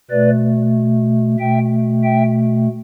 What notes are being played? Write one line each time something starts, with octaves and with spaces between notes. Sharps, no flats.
B2 A3 B4 D5
B2 A3 E5 G5
E5 G5